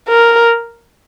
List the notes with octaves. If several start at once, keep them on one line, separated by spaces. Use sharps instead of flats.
A#4